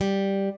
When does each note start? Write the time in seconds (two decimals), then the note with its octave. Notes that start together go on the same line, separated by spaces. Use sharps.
0.01 G3